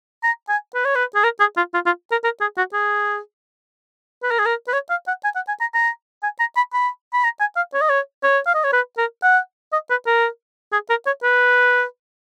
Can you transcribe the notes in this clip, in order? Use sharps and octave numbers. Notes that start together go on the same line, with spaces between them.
A#5
G#5
B4
C#5
B4
G#4
A#4
G#4
F4
F4
F4
A#4
A#4
G#4
F#4
G#4
B4
A#4
G#4
A#4
B4
C#5
F5
F#5
G#5
F#5
G#5
A#5
A#5
G#5
A#5
B5
B5
B5
A#5
G#5
F5
C#5
D#5
C#5
C#5
F5
D#5
C#5
B4
A#4
F#5
D#5
B4
A#4
G#4
A#4
C#5
B4